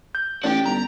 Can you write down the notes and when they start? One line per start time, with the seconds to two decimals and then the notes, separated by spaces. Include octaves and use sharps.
0.15 G6
0.44 A1 D4 F#4 G4 G5
0.66 G1 A#5